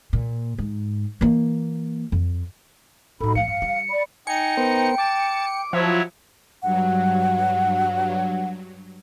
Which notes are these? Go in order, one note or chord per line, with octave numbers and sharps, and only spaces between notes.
A#2
G#2
E3 A#3
F2
A2 G3 D#4 F#4 A4 B5
E3 A3 F5 C#7
G2
G3
D5 B5
D#4 G5 G#5 C#7
B3 A#4 C5
A5 D6
F3 F#3 E4 C#5
G2 F#3 F#5